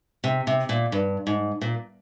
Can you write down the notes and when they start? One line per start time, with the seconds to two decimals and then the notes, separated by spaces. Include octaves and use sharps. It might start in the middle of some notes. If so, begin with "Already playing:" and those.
0.24 C3
0.47 C3
0.69 A#2
0.92 G2
1.27 G#2
1.61 A#2